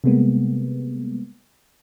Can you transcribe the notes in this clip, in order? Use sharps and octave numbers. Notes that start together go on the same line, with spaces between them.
C3 G3 G#3 A#3 B3